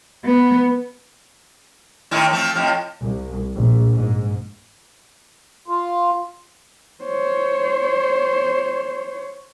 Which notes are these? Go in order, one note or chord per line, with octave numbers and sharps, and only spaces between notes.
B3
A2 D#3 E4
F3 A3 C4
F2 A2 F3
C2
A#1
G#2
F4
C5 C#5